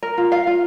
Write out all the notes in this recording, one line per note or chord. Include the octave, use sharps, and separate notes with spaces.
A#4
F4
F5
F4